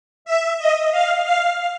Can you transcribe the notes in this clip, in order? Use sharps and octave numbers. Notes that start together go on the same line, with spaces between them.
E5
D#5
F5
F5